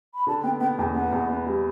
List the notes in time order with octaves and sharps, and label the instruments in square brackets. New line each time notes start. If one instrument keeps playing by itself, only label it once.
[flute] B5
[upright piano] D3 [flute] A5
[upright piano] B3 [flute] G5
[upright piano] B3 [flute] G5
[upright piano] E2 [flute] G5
[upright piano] B3 [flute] F#5
[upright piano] E2
B3
G3